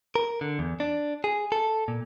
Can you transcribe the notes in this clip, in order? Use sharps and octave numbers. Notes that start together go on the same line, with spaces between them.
A#4
D3
E2
D4
G#4
A4
A#2